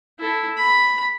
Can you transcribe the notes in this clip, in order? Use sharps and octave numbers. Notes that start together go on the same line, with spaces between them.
E4 A4
B5